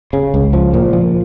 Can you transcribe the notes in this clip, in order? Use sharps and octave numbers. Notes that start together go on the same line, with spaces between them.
C#3
C#2
F3
A#2
F3